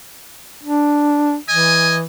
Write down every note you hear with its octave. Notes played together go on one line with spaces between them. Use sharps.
D4
E3 D#5 G#5